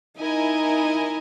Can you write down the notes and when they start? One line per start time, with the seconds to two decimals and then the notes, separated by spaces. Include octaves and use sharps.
0.20 D#4 E4 A#4 D#5 G#5